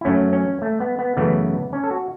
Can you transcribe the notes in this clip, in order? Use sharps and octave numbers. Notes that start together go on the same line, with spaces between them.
E4
F#2 F#3 A3 C#4
C#4
A3
B3
B3
F#2 C#3 E3 A3 B3
C#4
A4
F#4